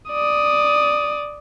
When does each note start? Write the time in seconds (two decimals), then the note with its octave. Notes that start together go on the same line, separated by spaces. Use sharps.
0.10 D5 D#6